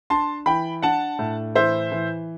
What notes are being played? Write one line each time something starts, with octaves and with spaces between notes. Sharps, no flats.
D4 A5 C6
E3 G5 B5
D4 F#5 A5
A2
E3 C5 E5
E3